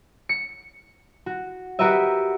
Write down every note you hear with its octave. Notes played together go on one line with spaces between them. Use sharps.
C#7
F#4
F#4 G4 A#4 B4 D#5 E5